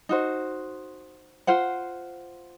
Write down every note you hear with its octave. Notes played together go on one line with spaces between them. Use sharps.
D#4 F#4 C5
F4 C5 F#5